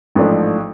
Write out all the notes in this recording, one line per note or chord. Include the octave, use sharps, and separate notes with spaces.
A1 G#2 F3 A3 D4